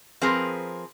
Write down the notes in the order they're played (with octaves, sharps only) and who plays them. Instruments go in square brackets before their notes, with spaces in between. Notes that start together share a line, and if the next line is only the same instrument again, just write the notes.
[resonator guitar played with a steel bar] F3 C4 G#4 A#4 B4